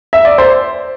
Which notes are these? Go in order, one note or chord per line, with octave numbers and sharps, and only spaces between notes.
E5
D5
C5